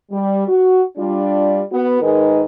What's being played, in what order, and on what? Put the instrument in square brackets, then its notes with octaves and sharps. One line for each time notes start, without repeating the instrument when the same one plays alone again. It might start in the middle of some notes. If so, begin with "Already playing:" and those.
[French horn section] G3
F#4
G3 D4 F4
B3 F#4
G#2 D#3 G#3 D#4 A#4 B4